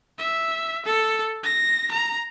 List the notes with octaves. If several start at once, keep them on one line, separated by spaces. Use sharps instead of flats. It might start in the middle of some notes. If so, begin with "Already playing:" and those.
E5
A4
A#6
A#5